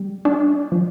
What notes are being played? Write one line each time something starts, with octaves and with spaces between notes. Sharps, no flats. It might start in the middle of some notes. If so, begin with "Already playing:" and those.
Already playing: G3
D4
F3